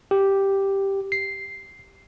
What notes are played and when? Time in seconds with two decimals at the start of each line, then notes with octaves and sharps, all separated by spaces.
0.11 G4
1.12 C7